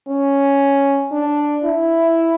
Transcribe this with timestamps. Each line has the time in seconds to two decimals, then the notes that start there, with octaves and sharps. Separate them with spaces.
0.08 C#4
1.12 D4
1.64 E4